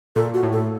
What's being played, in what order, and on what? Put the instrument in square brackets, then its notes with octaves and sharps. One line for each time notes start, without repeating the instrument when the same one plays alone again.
[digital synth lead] A#2 [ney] A4
[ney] F#4
[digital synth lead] A2
[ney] A4